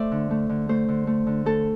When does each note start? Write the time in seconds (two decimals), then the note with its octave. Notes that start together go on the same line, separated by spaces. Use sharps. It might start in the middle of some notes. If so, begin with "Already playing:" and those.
Already playing: A3 C5 D5 E5
0.11 D3
0.30 A3
0.49 D3
0.69 A3 C5
0.88 D3
1.07 A3
1.27 D3
1.46 A3 A4